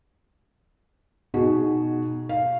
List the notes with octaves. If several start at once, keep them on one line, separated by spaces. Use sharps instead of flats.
B2 D#4 F#4 G#4
F5